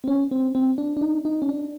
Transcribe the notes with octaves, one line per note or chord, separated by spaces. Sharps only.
C4
C#4
C4
C4
D4
D4
D#4
D#4
C#4
D4